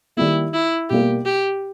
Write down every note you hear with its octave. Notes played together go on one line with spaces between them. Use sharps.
D#3 G3 A#3 E4
E4
B2 G3 A#3 G4
G4